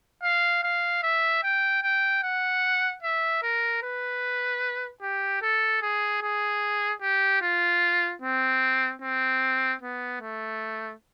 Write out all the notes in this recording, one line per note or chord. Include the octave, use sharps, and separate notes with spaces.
F5
F5
E5
G5
G5
F#5
E5
A#4
B4
G4
A4
G#4
G#4
G4
F4
C4
C4
B3
A3